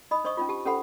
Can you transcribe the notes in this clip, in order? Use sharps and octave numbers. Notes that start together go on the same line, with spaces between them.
D#4 D#5 B5 D#6
D4 C5 D#5 C#6 D#6
C#4 D#4 F4
G4 A5
C#4 G4 A4 C5 F#5 B5